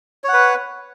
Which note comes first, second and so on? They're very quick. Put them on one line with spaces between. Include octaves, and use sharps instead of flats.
C#5 F#5 B4